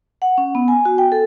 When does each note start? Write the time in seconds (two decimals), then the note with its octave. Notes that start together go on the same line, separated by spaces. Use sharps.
0.22 F#5
0.38 C#4
0.55 B3
0.68 G#5
0.85 F#4
0.98 G5
1.12 A4